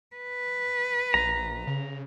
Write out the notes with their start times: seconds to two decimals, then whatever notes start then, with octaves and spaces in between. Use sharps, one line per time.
0.16 B4
1.14 A#1 A#5
1.67 C#3